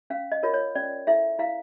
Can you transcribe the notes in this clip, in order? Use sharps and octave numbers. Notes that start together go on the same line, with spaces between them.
C#4 F5
D#5
F4 A#4 C#5
C#5
C#4 D5
E4 A4 E5
E4 F5